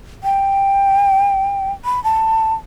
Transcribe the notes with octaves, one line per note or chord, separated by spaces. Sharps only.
G5
B5
A5